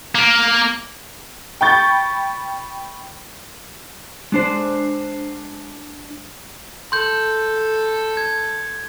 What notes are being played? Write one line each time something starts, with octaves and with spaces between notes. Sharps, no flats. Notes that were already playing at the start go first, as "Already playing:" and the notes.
A#3
G5 B5 C#6 G6 A6
G#3 D4 C5
A4 C6 G6
G#6